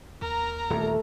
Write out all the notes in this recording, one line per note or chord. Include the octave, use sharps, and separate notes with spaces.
D#2 A#4 A#5
D#1 E2 A3